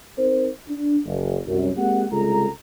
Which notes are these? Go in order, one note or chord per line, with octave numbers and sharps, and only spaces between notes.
C4 D#4 A#4 C5
D4
F#1
C2 F#2
G#3 A#3 C4 G4 F#5
C2 C#3 G#3 F4 A4 A#5